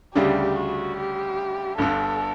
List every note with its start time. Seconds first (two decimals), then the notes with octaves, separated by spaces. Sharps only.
0.15 D2 C#3 G3 D4 G4
0.56 F#4
0.97 G4
1.78 G1 G2 D3 A4